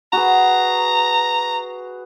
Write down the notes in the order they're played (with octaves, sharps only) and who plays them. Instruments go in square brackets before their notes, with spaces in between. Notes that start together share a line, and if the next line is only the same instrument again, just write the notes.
[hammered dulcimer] F#4 G#4 B4 [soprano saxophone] A#5